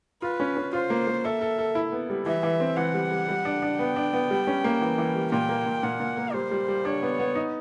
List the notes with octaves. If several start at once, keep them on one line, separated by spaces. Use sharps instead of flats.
F4 B4
C#4
C#4
F4 C5
A#3
A#3
A4 E5
A4
A4
E4
B3
G3
E3 E5
E3
C4
E3 F#5
G3
G3
G3
D4
D4
B3 G5
D4
B3
G3
C#4
A#3
E3
E3
G3
A#2 G5
A#3
A#2
A#2 F#5
A#2
A#3
G3 C5
G3
G3
D4 C#5
B3
B3
D#4